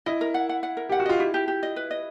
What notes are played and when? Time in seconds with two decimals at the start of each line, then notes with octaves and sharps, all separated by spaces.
0.06 E4 D#5
0.21 A#4
0.34 F#5
0.49 F#5
0.63 F#5
0.77 A#4
0.89 G4 F#5
1.00 F#4
1.06 F4 D#5
1.19 E4 G4
1.34 G4
1.48 G4
1.63 D#5
1.76 B4
1.91 D#5